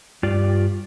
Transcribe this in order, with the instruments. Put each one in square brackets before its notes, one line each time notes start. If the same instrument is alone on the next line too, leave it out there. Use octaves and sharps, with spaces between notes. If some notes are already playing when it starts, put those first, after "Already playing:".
[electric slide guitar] G2 F4 G4 D5